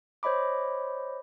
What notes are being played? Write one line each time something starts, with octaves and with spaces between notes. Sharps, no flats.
C5 C#5 D#5 B5 D6